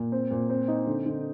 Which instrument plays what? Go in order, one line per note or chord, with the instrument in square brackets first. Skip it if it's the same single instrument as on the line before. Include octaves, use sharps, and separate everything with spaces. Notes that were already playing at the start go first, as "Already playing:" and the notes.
Already playing: [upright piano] A#2
C4
A#2
C4
D#4
D3
D3